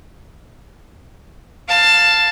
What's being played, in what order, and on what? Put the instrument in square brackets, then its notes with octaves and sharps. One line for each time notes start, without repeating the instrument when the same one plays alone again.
[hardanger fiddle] F5 A5